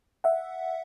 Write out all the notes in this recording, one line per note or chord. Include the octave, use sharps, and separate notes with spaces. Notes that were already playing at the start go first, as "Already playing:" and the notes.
E5 F#5